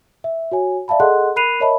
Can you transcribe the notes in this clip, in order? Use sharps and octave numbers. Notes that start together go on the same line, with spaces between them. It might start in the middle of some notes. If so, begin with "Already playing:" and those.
E5
F#4 C#5 G#5
D5 E5 F5 A5 B5
G#4 A4 D#5 F#5 C6 F#6
A#4 B5 F#6 C7 D#7 F7
A#4 C#5 D#5 E5 A5 B5